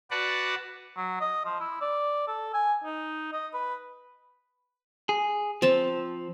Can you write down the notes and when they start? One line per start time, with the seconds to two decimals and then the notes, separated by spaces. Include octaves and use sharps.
0.11 F#4 B4 D5 F#5 A5
0.97 F#3
1.21 D#5
1.45 F3
1.60 E4
1.81 D5
2.28 A4
2.54 G#5
2.84 D#4
3.33 D#5
3.53 B4
5.09 G#4
5.62 F3 C4 A5